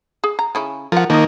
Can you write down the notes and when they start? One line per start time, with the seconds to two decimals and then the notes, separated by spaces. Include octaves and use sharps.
0.24 G#4
0.39 A#5
0.55 C#3 C#4 E4
0.92 F3 A#4 F#5
1.10 D#3 F3 A#3 D#4